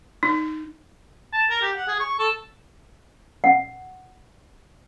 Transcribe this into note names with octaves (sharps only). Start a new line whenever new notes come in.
D#4
A5
A#4
G4
F#5
G#4
C#6
A4
F#5